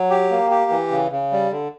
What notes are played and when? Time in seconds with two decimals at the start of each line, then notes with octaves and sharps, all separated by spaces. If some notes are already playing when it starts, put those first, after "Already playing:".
Already playing: F#3
0.10 G4
0.31 A#3
0.51 G4
0.71 E3
0.91 C#3
1.12 C#3
1.32 G3
1.51 D3